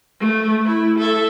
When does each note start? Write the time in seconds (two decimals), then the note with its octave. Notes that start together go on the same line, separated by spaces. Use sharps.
0.20 A3
0.65 E4
0.99 A4 E5